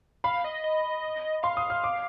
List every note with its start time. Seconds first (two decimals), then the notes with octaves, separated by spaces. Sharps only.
0.24 F5 B5
0.44 D#5
0.64 D#5
1.43 F5 C6
1.57 D#6
1.70 F6
1.84 D6